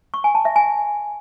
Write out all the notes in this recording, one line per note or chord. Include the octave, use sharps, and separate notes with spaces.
C#6
G#5
A5
E5
G#5